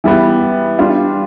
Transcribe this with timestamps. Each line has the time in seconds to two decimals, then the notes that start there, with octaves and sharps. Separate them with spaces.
0.04 E3 G3 B3
0.79 G3 D4 F4